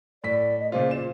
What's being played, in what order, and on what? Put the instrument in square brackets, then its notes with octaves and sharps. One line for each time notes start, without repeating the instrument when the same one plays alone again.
[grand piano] A2 B6 [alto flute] D5
[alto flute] D#5
[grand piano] A#2 C#3 F4 [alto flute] C5
[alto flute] F4 [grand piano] E7